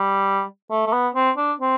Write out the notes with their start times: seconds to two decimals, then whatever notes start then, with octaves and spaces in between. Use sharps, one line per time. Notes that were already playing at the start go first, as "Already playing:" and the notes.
Already playing: G3
0.71 A3
0.86 A3
0.93 B3
1.15 C4
1.37 D4
1.60 C4